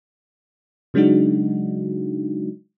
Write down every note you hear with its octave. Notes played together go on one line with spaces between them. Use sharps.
C#3 F#3 G#3 D4 D#4 F#4